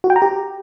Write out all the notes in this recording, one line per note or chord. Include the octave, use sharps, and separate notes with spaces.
F#4
G5
A#5
G4